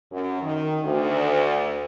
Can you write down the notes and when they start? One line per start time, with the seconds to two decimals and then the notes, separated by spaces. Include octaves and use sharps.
0.11 F#2
0.41 D#3
0.83 D2